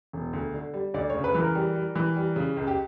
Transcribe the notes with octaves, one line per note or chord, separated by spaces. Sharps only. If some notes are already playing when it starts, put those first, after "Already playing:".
E1
D2
D3
G3
D2 D5
C#3 C#5
B4
E3
A#4
G3
G3
E3
G3
C#3
C#2
G4